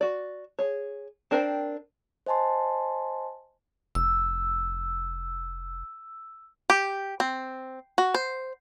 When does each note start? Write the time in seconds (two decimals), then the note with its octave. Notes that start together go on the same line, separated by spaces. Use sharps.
0.01 F#4 D5
0.59 G#4 C#5
1.31 C4 D4 A#4 C5 G5
2.26 C5 D#5 G#5 A5 C6
3.95 F1 E6
6.70 G4
7.20 C4
7.98 F#4
8.14 C5